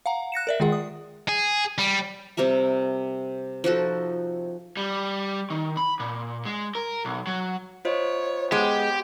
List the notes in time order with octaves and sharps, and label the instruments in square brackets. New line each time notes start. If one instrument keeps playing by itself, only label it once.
[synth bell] F5 F#5 A#5
F#6 A#6 C#7 E7
A#4 D5 E5
D#3 G#3 F4 G#4 F#5
D#6
[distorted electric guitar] G#4
G3
[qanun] C3 G3 A#4 E5
F3 D#4 F#4 A4
[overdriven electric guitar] G3
D#3
B5
A#2
G#3
A#4
B1
F#3
[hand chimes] F4 C5 D#5 [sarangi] C#5
[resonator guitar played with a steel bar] G#3 [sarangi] B3 [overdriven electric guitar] G4